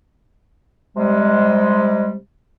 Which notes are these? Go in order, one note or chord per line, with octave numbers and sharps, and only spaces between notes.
C3 G3 G#3